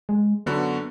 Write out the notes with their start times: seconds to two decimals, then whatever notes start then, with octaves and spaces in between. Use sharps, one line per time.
0.09 G#3
0.46 F#2 D3 B3 F#4